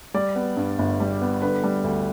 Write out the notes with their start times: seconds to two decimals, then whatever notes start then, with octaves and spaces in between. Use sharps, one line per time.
0.14 G3 D5
0.35 B3
0.57 G2
0.79 G1
1.00 G3
1.22 B3
1.42 D3 B4
1.64 G3
1.84 D2